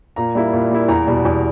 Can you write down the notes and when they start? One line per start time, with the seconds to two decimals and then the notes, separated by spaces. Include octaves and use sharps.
0.16 A#2 A#5
0.35 G3 A#3 E4
0.53 A#2
0.71 G3 A#3 E4
0.89 E2 A#5
1.07 B2 G3
1.25 E2